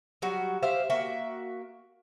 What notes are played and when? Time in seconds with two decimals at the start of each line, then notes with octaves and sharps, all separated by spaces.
0.22 F#3 G3 F#4
0.63 G4 C5 E5 F5
0.90 A#3 F#4 E5 G5